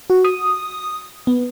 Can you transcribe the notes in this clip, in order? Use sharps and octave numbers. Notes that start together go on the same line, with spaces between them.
F#4
D#6
B3